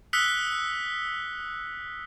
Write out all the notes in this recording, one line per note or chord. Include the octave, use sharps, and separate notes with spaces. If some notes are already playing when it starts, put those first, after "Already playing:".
D#6 E6 F#6 B6 C#7 G7